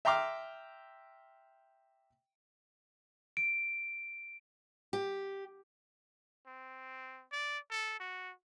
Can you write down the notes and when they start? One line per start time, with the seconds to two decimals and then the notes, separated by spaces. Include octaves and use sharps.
0.05 E5 G5 A#5 C6 D6 F6
3.37 D7
4.93 G4
6.47 C4
7.32 D5
7.71 A4
8.00 F#4